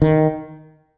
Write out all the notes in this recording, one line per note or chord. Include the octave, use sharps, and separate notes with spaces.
D#3